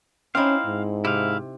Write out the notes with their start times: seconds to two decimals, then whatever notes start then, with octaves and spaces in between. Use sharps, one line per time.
0.35 C4 C#4 D#4 E4 F5
0.66 G#2
1.05 C3 E4 F5